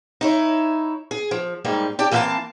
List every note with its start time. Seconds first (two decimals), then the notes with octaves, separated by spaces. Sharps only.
0.21 D#4 E4 C#5
1.11 G#4
1.31 F3
1.64 G#2 G3 A#3 D#4
1.99 G4 D5 G5 A5
2.11 E3 A#3 C4 E5 F5 A5